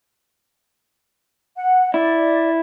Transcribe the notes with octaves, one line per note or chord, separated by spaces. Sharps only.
F#5
E4 D5